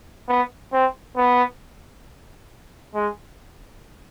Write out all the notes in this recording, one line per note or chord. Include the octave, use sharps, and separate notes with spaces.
B3
C4
B3
G#3